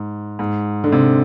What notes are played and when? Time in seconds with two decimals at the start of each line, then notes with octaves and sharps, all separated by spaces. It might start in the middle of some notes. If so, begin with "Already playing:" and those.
Already playing: G#2
0.39 G#2
0.84 D3
0.92 C3